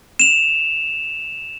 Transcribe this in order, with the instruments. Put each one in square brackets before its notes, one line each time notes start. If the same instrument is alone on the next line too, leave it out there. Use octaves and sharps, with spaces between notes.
[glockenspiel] E7 F7